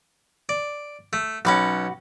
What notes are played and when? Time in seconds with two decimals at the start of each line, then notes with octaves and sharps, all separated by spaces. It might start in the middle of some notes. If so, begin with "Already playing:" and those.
0.49 D5
1.13 A3
1.45 B1 C#4 F#4 B5 D6